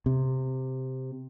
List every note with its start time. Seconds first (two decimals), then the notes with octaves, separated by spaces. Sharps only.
0.06 C3